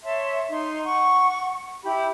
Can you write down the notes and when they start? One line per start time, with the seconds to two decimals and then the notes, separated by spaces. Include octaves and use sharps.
0.03 C#5 E5 A5 C6
0.50 D#4 C6
0.85 F#5 C#6
1.83 E4 G4 B5